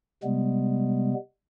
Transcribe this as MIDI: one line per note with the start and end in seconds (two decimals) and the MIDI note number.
0.23 1.14 48
0.23 1.14 55
0.23 1.14 56
0.23 1.14 59